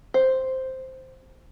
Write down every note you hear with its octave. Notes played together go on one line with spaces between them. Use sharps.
C5